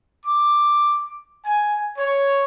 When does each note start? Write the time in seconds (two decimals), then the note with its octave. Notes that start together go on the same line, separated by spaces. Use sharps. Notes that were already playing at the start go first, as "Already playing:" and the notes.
0.25 D6
1.44 G#5
1.97 C#5